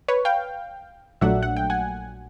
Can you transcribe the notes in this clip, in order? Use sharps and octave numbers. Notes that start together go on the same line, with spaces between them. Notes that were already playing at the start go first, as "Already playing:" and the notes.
B4 C#5
F5 G5
A#1 A#2 F#3 A3 D4 E5 F#5
F#5
G5
F#5 G#5